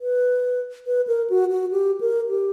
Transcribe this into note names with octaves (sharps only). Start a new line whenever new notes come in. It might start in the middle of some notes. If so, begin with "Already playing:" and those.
B4
B4
A#4
F#4
F#4
G4
A#4
G4